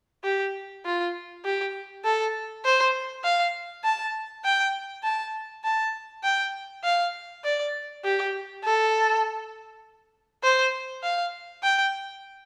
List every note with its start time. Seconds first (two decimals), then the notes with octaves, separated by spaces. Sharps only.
0.24 G4
0.85 F4
1.45 G4
2.04 A4
2.65 C5
3.24 F5
3.84 A5
4.45 G5
5.04 A5
5.64 A5
6.24 G5
6.84 F5
7.44 D5
8.04 G4
8.64 A4
10.43 C5
11.03 F5
11.63 G5